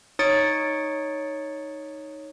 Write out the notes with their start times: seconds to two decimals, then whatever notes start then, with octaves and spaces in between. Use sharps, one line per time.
0.19 D#4 C#5 D#6 A6 C#7 D7